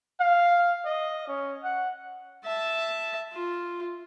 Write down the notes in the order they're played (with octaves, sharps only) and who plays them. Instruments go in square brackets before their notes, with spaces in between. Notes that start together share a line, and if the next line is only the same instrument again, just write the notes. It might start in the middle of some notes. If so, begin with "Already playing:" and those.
[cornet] F5
D#5
C#4
F#5
[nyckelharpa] E5 A5
F4